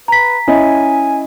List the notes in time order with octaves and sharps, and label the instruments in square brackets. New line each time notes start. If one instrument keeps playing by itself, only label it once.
[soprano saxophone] B4 [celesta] A#5 B6
[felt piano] C#4 E4 D#5 [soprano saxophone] G#5